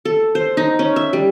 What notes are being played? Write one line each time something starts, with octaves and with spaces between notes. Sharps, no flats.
A4
C5
D#4
C#4
E5
G3